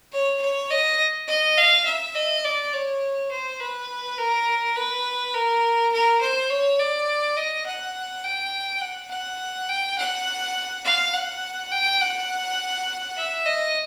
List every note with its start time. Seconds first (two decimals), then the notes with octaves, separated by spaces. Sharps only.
0.12 C#5
0.41 C#5
0.70 D#5
1.28 D#5
1.57 F5
1.86 E5
2.15 D#5
2.44 D5
2.73 C#5
3.31 C5
3.60 B4
4.18 A#4
4.76 B4
5.34 A#4
5.92 A#4
6.21 C5
6.50 C#5
6.79 D5
7.37 D#5
7.66 F#5
8.24 G5
8.81 F#5
9.10 F#5
9.69 G5
9.98 F#5
10.84 F5
11.14 F#5
11.71 G5
12.01 F#5
13.17 E5
13.46 D#5